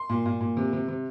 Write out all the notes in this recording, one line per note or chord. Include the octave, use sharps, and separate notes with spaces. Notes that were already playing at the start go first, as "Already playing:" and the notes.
Already playing: C6
A#2
A#2
A#2
C3
C3
C3